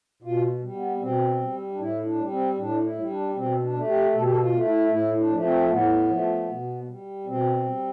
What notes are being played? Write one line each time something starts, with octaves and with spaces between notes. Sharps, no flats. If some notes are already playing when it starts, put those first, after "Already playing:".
B2 F4
G3
B3
B2 C4
G3
D4
A2 E4
D4
G3
C4
A2 D4
E4
G3
D4
B2 C4
D4
A3
G4
B2 A4
G4
A4
F4
A3
E4
A2 E4
D4
F3 A3
C4
A2 B3
F3 A3
B2
G3
B2 C4
G3